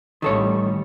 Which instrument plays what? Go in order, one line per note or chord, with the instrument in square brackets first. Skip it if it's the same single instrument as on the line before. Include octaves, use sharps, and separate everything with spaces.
[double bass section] A1 G3 [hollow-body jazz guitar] D#3 A4 C#5